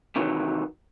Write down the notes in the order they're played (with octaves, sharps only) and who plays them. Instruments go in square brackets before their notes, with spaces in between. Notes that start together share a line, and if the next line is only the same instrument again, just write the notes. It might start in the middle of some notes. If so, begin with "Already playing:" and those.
[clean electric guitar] C3 D#3 E3 F#3